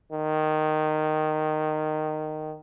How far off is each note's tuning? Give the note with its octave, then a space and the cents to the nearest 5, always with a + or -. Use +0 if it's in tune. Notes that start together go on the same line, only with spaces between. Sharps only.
D#3 -10